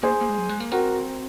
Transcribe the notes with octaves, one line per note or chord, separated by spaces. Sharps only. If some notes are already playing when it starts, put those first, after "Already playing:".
A#3 G#4 C5
A#3
G#3
F#3
G#3
A#3
C4 F#4 A#4